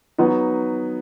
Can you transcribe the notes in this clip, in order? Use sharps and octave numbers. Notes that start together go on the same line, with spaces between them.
F#3 B3 D#4